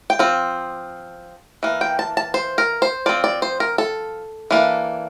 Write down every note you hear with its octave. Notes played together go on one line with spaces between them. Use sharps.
G5
F3 C4
E3 A#3
G5
A5
A5
C5
A#4
C5
F3 C4 D5
D5
C5
A#4
A4
E3 A#3 D4